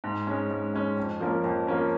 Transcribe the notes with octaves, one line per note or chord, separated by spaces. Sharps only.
G#2
G#3 C#4
G#2
G#3 C#4
F2
F3 A#3 C#4 A#4
F2
F3 A#3 C#4 A#4